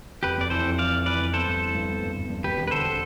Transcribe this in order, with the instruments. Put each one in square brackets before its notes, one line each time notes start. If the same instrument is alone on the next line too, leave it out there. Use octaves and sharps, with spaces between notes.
[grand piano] F1 [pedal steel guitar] G4 B4
[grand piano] F1 [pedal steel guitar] D5
[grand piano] E3 [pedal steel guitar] A4 C5
[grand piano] F2
[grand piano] E3 [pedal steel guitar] D5 F5
[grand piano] F2
[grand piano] E3 [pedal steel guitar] B4 D5
[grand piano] F1
[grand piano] B3 [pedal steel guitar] A4 C5
[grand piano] G2
E3
G2
B3
G2
G1
G2
[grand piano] E1 [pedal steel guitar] G4 B4
[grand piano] E1
[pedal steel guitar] B4
[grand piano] D3 [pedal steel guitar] A4 C5